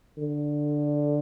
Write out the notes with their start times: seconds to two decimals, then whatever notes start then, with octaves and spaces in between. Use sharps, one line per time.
0.18 D3